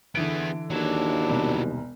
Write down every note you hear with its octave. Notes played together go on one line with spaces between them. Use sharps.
D3 E3 B3 G#4 D7
D#2 F#3 D4 E4
E1 C2